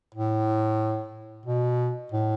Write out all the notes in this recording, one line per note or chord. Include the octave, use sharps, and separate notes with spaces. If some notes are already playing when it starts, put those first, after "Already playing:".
A2
B2
A2